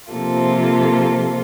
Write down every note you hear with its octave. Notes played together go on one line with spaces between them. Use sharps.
C3 F3 A#3 F4 A4